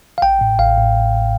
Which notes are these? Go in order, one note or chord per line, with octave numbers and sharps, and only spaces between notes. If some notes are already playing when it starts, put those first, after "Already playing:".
F5
A1 G5
A2
A1 F5
A2